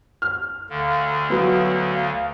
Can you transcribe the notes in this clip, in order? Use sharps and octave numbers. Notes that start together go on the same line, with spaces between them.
F6
D2 D3 F5
F#3 B3